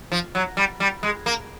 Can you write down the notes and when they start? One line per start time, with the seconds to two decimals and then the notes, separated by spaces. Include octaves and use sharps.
0.12 F3
0.35 F#3
0.57 G3
0.80 G3
1.03 G#3
1.26 A#3